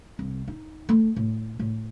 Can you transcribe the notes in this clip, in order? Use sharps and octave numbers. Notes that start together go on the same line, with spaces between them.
C2
D#4
A3
A2
A2